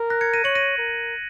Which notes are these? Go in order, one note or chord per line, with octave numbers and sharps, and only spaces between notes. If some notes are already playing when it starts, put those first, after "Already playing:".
Already playing: A#4
F#6 A#6
G#6 C#7
A#6 D#7
C#5 C#7 F#7
A#6 D#7
A#4